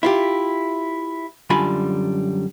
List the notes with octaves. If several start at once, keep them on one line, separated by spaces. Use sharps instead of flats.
E4 F4 G4
F#2 D3 G3 F4 G#5 B5